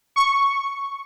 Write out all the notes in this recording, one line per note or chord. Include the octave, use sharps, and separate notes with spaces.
C#6